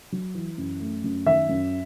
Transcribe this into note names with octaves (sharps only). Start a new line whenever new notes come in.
F#3
E3
F#2
A3
F#2
D#3 E5
F#2